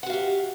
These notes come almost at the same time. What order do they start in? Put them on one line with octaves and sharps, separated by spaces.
F#5 F#4 F5 G4